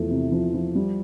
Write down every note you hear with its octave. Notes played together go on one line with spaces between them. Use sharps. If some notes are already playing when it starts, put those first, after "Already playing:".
Already playing: E2 F3 A3
C3
F3
F3
G3